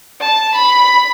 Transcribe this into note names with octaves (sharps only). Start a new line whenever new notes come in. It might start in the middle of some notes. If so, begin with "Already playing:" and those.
A5
B5